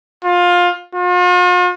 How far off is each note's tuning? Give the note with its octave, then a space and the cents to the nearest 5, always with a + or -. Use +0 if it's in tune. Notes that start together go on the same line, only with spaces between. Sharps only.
F4 +20
F4 +45